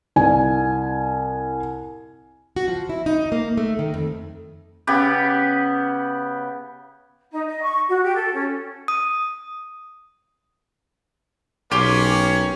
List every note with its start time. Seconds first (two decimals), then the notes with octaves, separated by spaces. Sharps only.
0.16 C2 G#5
2.56 F#4
2.68 F3
2.89 E4
3.06 D#4
3.32 A#3
3.57 A3
3.79 D#3
3.94 F2
4.87 C#3 B3 G4
7.31 D#4
7.46 D#5
7.61 C#6
7.87 F#4
8.02 G4
8.14 A4
8.33 C#4
8.88 D#6
11.71 B1 A#3 C#4 G4 C#5 C6 D6